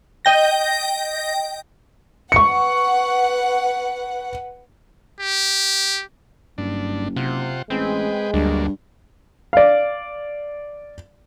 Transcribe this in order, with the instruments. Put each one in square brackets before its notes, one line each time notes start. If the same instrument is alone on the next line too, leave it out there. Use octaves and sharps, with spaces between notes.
[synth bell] D#5 G5 A#6
[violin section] B4 F#5 [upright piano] C#6 C#7
[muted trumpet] G4
[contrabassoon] F#1 [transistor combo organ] G2 D4
[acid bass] C3 [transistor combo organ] F4 C5 F#5
[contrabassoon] A1 [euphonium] G#3 [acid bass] C4 [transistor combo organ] G#4 B4 G5
[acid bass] D2 [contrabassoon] G2 [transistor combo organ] F#3 A#3 D4
[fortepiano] D5 F5